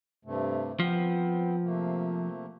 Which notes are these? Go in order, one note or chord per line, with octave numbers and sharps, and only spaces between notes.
G2 C3 A3
F3 B3 C4
C3 A3 A#3